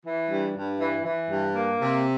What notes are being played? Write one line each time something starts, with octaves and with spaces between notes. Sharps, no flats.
E3
G2
G2
E3
E3
G2
A#3
C3